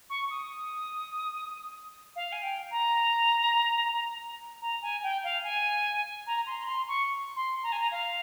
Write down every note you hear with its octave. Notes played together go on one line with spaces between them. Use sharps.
C#6
D#6
F5
G#5
G5
A#5
A#5
G#5
G5
F5
G#5
A#5
C6
A#5
C6
C#6
C6
A#5
G#5
A#5
F5